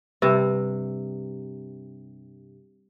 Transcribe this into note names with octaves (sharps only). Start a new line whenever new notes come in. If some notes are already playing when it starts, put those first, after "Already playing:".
G2 C3